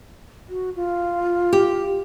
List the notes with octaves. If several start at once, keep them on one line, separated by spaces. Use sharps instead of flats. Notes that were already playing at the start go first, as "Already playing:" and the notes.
F#4
F4
G4